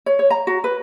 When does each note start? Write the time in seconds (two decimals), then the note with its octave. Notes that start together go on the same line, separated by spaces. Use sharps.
0.06 C#5
0.19 C#5
0.30 A#5
0.47 F#4
0.64 B4